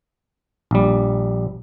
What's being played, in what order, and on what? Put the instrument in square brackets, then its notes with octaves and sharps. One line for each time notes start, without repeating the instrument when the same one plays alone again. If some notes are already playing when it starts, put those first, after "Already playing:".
[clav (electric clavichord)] A#1 G3